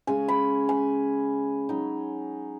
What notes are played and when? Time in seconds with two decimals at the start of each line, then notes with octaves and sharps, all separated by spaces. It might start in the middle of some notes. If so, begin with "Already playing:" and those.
0.07 C#3 G#3 C#4 G#5
0.28 B5
0.69 G#5
1.69 F#3 D#4